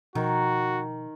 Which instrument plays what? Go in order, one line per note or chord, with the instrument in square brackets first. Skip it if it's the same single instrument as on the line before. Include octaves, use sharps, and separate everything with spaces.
[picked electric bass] B2 F3 [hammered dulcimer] D#3 [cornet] F#4